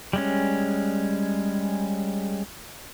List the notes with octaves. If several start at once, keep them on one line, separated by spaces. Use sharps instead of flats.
G3 G#3 C#4